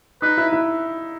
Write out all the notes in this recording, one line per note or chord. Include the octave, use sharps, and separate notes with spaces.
D#4 B4
E4
E4